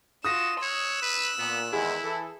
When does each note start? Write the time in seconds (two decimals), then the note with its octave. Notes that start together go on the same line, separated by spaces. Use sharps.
0.24 F4 F#4 D#6 A#6 E7
0.62 C#5 E6 F#6
1.02 B4
1.39 A#2 B3
1.73 E2 D#3 G#3 E4 G#4
2.03 E3 A4